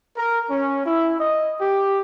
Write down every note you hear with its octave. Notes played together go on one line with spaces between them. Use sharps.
A#4
C#4
E4
D#5
G4